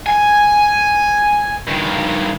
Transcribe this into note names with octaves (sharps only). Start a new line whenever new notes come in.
G#5
G2 D#3